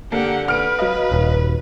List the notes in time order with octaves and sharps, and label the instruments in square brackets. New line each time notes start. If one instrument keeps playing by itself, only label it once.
[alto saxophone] D3 [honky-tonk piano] A#3 [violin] G4 F#5
[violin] B4 [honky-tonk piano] F6 D7
[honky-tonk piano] F#3 D#5 [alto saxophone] F5
[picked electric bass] D#1